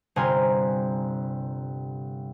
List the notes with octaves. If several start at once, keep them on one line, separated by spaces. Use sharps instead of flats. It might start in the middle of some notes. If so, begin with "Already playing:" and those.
G1 C3 G#5 A#5 C6 F6